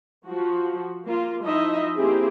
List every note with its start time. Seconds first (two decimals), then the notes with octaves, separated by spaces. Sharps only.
0.25 F3 F#4
1.04 A#3 F4
1.43 F3 D#4 E4 D#5 E5
1.96 A#3 C4 E4 G4 G#4